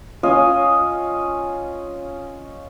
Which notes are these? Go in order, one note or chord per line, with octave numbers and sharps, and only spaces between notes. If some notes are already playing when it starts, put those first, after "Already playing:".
C#4 F4 C#5 D#5